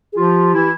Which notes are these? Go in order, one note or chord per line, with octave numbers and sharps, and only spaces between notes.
G#4
F3 F4 G4
E3 E4